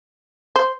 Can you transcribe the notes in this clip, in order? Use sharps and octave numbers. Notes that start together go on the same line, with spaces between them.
C5